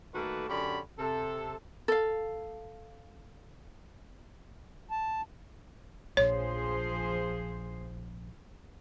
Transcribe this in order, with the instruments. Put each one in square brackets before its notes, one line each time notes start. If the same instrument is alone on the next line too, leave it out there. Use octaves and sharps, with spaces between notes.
[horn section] D#3 A3 A#3 F#4 A4 B4
F#2 D3 C#4 G4 D5 B5
C3 A4
[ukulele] A4 F5
[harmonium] A5
[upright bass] A#1 [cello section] F3 G#4 C5 [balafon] C#5